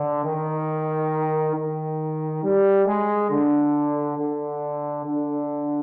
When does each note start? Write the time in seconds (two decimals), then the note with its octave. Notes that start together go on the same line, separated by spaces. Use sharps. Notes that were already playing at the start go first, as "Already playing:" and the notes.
Already playing: D3
0.24 D#3
1.55 D#3
2.43 G3
2.87 G#3
3.30 D3
4.17 D3
5.05 D3